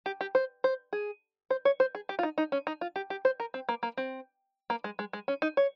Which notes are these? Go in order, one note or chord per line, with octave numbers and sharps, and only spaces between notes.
G4
G4
C5
C5
G#4
C5
C#5
C5
G#4
G4
F4
D#4
D#4
C#4
D#4
F4
G4
G4
C5
A#4
C4
A#3
A#3
C4
A#3
G#3
G#3
G#3
C#4
D#4
C#5